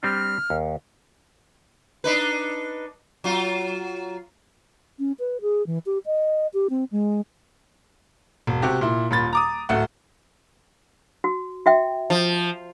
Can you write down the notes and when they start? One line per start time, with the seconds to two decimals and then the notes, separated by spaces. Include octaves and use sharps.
0.03 G3 C4 D4 F6
0.50 D#2
2.04 D4 D#4 B4
3.24 F#3 F4
4.99 C#4
5.19 B4
5.42 G#4
5.67 E3
5.86 G4
6.06 D#5
6.54 G4
6.70 C4
6.92 G#3
8.47 E1
8.62 C3 F#4 G4
8.81 A#2 E4
9.11 D#1 A#2 B5 A6
9.33 A#5 D6 D#6
9.69 D1 A3 F#5
11.24 F#4
11.66 F#4 E5 G5
12.10 F3